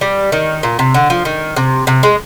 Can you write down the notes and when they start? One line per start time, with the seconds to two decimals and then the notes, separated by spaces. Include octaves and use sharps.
0.01 G3
0.32 D#3
0.63 A#2
0.79 C3
0.94 D3
1.10 F3
1.25 D#3
1.56 C3
1.87 C3
2.03 G#3